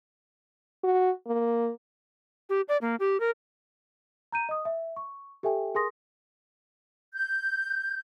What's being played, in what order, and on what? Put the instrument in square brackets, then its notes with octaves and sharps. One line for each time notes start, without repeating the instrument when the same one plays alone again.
[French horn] F#4
A#3
[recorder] G4
D5
A#3
G4
A#4
[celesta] A#5 G6 D#7
D#5 D#6
E5
C#6
G4 A4 E5 G5 G#5
G#4 A#4 G#5 C6 D#6 A#6
[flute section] G6